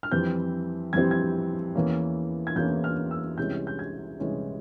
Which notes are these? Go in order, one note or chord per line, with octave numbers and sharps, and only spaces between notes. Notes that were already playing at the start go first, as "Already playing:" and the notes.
F6
F2 E3 G3 C4 G6
F2 E3 G3 C4 G#6
G#6
E2 E3 A#3 C#4
G#6
E2 E3 A#3 C#4 G6
F6
E6
C2 C3 E3 G#3 C#4 G6
G6
G#6
C2 C3 E3 G#3 C#4